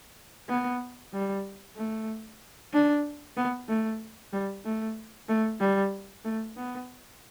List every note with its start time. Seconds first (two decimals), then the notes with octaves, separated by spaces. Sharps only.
0.49 B3
1.13 G3
1.77 A3
2.73 D4
3.37 B3
3.69 A3
4.33 G3
4.65 A3
5.29 A3
5.60 G3
6.24 A3
6.57 B3